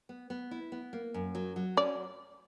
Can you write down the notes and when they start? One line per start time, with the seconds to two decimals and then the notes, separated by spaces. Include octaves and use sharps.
0.09 B3
0.30 B3
0.51 E4
0.72 B3
0.93 A#3
1.14 F#2
1.35 F#3
1.56 F#3
1.77 C#4 D5